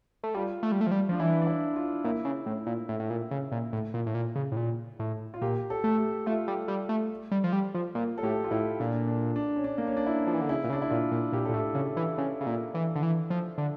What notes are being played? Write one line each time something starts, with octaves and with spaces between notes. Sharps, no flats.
A3
G3 F4
A3
G3
A3
F3
G3
F3 D4
E3 E4
D4
E4
F4
A#2 E4
C#3
A2
A#2
A2
A2
A#2
C#3
A#2
A2
A#2
A2
A#2
C#3
A2
A#2
A2
F4
A#2 G4
A4
A3
G4
A3 F4
G3
G3
A3
G3
F3
G3
F3
A#2 F4
A4
A2 G4
F4
A2 E4
A#2 D4
D4
D4
C#4
D4
A#3
C#4
D4
E4
F3
E3
D3
C#3 E4
A#2
C#3
D4
E4
A#2 F4
A#2
A#2 G4
A#2 A4
A2
G4
C#3
E3
C#3
C#3
A#2
E3
D3
E3
F3
D3